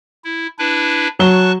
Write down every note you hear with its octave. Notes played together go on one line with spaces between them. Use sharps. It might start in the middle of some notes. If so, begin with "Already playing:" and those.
E4
D4 E4 B4
F#3 A5 C#6 F#6 G7